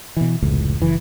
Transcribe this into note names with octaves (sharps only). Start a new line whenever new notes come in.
B2 E3
F1 C#2 A2
F#1 E3